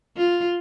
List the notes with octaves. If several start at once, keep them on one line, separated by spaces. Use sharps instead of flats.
F4